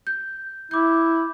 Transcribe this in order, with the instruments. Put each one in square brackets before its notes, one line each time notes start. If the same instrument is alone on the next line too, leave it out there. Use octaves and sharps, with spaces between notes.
[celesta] G6
[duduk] E4 [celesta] D6 G6